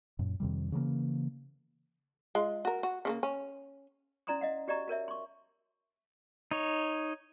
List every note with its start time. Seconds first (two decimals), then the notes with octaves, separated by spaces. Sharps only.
0.19 F#2 A#2
0.40 F2 C3 D#3 G3
0.72 C#3 E3 A3 A#3
2.35 G#3 F4
2.65 F#4 A#4
2.83 F#4
3.05 C#3 F3 A#3
3.23 C#4
4.27 C#4 E4 D5 A#5 C6 D#6
4.41 D#5 F5 F#5
4.68 F#4 G4 D5 D#5 A#5 C#6
4.88 F#4 A#4 C#5 E5
5.08 C6 C#6
6.51 D#4 C#5